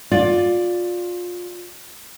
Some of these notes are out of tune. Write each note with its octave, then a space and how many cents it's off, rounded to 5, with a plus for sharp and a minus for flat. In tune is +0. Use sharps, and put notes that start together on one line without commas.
F4 +25 D5 +0